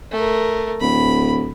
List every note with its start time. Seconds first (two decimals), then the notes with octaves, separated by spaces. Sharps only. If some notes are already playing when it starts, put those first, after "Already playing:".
0.12 A3 A#4
0.81 D1 B5